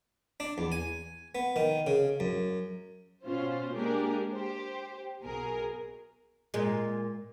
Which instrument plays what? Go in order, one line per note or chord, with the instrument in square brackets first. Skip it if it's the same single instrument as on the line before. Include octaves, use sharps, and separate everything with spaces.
[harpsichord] D4
E2
G#5
B3
D#3
C#3
F#2
[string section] B2 C#4 F4 C5
G#3 A#3 D4 G4 G#4 A#4
G4 C5
B1 B2 G#4 A#4
[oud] A#2 G#3